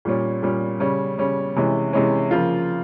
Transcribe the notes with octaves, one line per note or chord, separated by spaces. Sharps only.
A#2 G3 C#4
A#2 G3 C#4
C#3 G3 C#4
C#3 G3 C#4
C3 E3 G#3 C#4
C3 E3 G#3 C#4
C#3 F3 A#3 F4